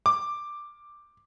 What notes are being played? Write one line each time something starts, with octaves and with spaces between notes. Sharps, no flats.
D6